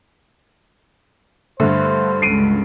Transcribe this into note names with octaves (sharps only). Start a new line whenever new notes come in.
G2 D3 A3 C5
C#2 C7 D7 D#7